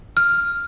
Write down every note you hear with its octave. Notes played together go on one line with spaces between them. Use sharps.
F6